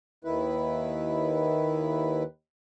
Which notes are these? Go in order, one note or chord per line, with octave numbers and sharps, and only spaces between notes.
D#2 D#3 E4 B4